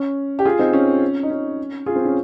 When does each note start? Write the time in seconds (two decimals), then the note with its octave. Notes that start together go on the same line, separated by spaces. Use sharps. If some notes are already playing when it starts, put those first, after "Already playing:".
Already playing: C#4
0.39 G4
0.45 F4 G#4
0.59 C4 D#4
0.73 C#4
1.23 D#4
1.30 C#4
1.86 F4 G#4
1.96 C4
2.05 C#4